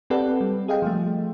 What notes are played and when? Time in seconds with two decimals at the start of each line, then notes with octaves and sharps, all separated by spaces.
0.10 C4 G4 A4 B4 D5 F#5
0.41 G3
0.68 G#4 D#5 F5 G5
0.82 F3 G3 A3